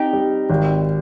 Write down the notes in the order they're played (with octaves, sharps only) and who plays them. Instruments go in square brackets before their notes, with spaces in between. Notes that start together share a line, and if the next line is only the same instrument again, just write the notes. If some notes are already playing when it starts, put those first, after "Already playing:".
Already playing: [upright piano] C4 [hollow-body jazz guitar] D#4 G4
[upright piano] G3
G#1